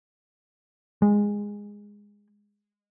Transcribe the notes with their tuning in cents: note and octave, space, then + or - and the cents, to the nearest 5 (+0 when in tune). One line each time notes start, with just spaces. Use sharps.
G#3 -15